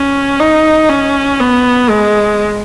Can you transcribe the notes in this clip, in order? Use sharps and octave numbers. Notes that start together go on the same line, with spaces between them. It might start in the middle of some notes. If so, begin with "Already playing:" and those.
Already playing: C#4
D#4
C#4
B3
G#3